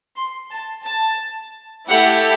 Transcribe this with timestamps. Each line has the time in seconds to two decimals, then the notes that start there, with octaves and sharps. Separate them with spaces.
0.16 C6
0.50 A5
0.85 A5
1.89 A3 E4 G4 F#5